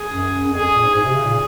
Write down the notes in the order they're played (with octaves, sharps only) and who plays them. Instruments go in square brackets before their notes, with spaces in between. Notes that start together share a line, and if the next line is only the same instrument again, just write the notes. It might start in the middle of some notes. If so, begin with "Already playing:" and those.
Already playing: [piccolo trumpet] G#4
[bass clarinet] F#2
F#2
[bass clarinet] F2 [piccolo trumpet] G#4
[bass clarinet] A#2
G#2
[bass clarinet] G#2 [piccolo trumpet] G#4
[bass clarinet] C3
C#3
A#2